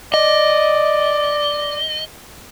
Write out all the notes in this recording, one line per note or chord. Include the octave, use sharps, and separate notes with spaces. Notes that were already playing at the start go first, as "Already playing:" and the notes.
D5 D#5